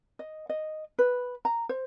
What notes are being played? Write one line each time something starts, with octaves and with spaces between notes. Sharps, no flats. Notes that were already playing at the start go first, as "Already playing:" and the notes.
D#5
D#5
B4
A#5
C5